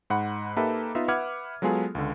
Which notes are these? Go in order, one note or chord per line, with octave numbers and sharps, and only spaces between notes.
G#2 F#5 B5
A#3 D#4 G4 A4 B4 E5
B3 D#4 F4 D#5 E5
B4 E5 F#5 D6 F6 G#6
F#3 G#3 B3 F4 G#4 A4
C#2 D3